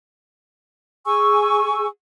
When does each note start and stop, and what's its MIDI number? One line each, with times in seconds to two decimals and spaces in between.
1.05 1.86 68
1.05 1.86 80
1.05 1.86 85
1.05 1.86 88